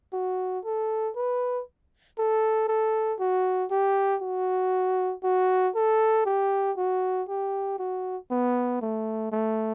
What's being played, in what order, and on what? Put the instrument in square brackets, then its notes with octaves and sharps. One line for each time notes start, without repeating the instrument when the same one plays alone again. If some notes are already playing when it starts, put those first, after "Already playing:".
[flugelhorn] F#4
A4
B4
A4
A4
F#4
G4
F#4
F#4
A4
G4
F#4
G4
F#4
B3
A3
A3